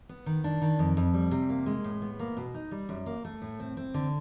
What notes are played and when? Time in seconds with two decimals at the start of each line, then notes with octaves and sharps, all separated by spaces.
0.09 B3
0.26 D#3
0.44 D4
0.62 D#3
0.79 F2
0.97 F2
1.14 G3
1.31 C3
1.50 A#3
1.66 G#3
1.84 A2
2.02 B3
2.19 A#3
2.37 B2
2.54 D#4
2.71 G3
2.89 F#2
3.06 A#3
3.25 A3
3.42 A2
3.60 C4
3.77 C4
3.94 D3